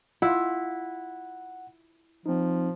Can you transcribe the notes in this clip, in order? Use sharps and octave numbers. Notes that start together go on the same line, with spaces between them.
E4 F4 F#5
F3 C4 D#4